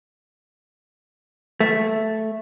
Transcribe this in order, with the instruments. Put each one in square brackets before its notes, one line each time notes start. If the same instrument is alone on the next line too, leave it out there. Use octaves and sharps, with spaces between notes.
[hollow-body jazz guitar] A3